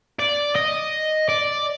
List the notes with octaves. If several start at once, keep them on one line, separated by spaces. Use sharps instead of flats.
D5
D#5
D5